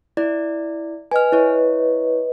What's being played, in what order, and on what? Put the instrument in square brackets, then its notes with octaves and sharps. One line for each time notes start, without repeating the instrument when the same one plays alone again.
[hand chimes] E4 D5
[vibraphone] B4 D#5 [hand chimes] G#5 F6
[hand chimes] E4 C#5